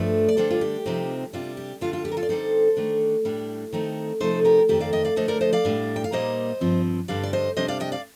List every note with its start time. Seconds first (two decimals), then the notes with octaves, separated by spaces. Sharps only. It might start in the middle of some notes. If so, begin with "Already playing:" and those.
Already playing: G2 F3 A3 D4
0.29 D5
0.37 D3 G3 D4 A4 C5
0.51 F4
0.61 G4
0.86 C3 F3 C4 D#4
1.33 C3 G3 D4 F4
1.57 G4
1.81 D3 G3 D4 F4
1.93 F4
2.05 G4
2.12 A#4
2.17 F4 A4
2.23 D5
2.29 D3 G3 C4 D#4 A4 C5
2.77 D#3 A3 D4
3.25 A2 G3 D4
3.73 D#3 A3 C4 D#4
4.20 C3 F3 A3 D#4 A4 C5
4.45 G4 A#4
4.69 F2 D#3 A3 G4
4.80 D5 F5
4.93 D#5 G5
5.05 D5 F5
5.16 D3 F3 A3 C5 D#5
5.28 A#4 D5
5.41 C5 D#5
5.53 D5 F5
5.65 A2 G3 D4
5.96 G5
6.04 F5
6.12 A#2 G3 A#3 D#4 C5 D#5
6.61 G2 F3 C4
7.08 G2 D3 G3 D4 D5 F5
7.23 D5
7.33 C5 D#5
7.56 C3 G3 D4 C5 D#5
7.68 D5 F5
7.80 D#5 G5
7.92 D5 F5